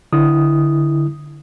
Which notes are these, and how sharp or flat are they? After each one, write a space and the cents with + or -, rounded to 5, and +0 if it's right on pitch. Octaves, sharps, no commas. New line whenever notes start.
D3 +0 E4 +0 D#6 +0